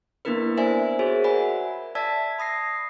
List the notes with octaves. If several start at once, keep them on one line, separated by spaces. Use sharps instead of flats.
A#3 B3 D4 E4 A#4 B4
A#4 C5 D5 E5 G#5
F#4 G#4 C5 C#5 E5
A#4 D5 E5 F#5 G#5 B5
D5 E5 A5 E6 G#6 B6
B5 D#6 A#6 C7